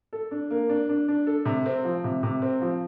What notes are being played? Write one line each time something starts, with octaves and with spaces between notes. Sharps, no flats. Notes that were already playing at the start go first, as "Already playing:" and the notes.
A4
D4
A#3
D4
D4
D4
A4
C3
C4
F3
C3
C3
C4
F3